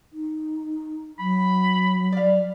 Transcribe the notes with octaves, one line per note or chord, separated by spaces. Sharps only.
D#4
F#3 B5
D5 F5